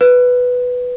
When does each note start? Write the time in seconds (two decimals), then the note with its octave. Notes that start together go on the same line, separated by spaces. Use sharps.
0.01 B4